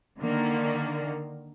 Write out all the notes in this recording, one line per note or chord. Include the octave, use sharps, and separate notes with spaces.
D3 D#3 A#3